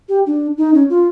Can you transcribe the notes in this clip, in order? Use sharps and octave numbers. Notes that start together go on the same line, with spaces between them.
G4
D4
D#4
C#4
F4